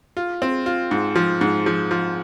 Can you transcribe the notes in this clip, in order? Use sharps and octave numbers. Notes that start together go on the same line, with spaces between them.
F4
C4
F4
G#2
F3
G#2
F3
F3